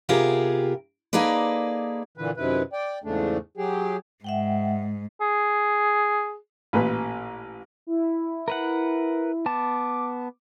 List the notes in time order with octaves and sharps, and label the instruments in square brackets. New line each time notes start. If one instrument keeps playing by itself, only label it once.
[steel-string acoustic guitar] C3 B3 F4 G4 G#4 A#4
A#3 D#4 G#4 A4 B4 D5
[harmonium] A#2 D3 E3 B4
F#2 C3 D#3 E4 B4
D5 G5
E2 G#2 C#3 A3 D4
F#3 G4 G#4
[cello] G#2 [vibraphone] E5 F#5 G5
[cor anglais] G#4
[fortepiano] A1 A#2 B4
[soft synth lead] E4
[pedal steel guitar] A#4 B4 F#5
[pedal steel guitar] B3 A5 [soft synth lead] D6